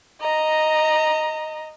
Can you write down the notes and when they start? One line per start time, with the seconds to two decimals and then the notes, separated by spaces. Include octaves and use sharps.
0.20 D#5 A#5